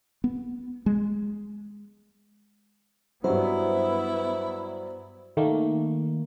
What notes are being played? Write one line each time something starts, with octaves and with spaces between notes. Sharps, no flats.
B3
G#3
G2 F#3 B3 E4 C5
D#3 A3 A#3